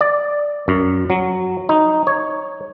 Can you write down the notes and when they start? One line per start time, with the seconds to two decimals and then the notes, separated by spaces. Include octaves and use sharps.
0.01 D5
0.68 F#2
1.10 F#3
1.69 D#4
2.07 C#5